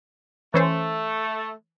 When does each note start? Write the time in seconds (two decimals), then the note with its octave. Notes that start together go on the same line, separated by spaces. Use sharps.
0.54 E3 A3 C#4 C5